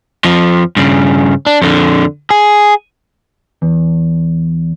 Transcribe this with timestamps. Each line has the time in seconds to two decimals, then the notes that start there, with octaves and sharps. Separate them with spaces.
0.25 F2 F3
0.77 G2 C#3
1.47 D4
1.62 F2 D3
2.31 G#4
3.62 E2